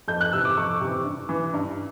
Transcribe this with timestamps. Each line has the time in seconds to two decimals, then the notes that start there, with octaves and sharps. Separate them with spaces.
0.08 F2 G6
0.21 F#6
0.33 C3 E3 E6
0.45 D6
0.56 F2 C#6
0.80 C3 E3
1.05 G2
1.29 E3
1.54 G2